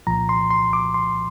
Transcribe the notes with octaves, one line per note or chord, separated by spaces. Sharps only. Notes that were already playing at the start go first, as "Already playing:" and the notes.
C2 A#2 F3 A#5
C6
C6
D6
C6